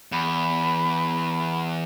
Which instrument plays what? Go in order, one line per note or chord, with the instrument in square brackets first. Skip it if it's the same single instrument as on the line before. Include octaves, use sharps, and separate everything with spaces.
[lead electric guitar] E2 [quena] B5